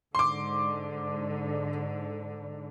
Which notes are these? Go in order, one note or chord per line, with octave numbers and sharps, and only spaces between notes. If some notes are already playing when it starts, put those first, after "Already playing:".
G#2 D3 C6 D6